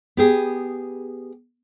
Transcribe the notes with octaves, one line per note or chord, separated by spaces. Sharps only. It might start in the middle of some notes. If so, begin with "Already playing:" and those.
B3 G4 G#4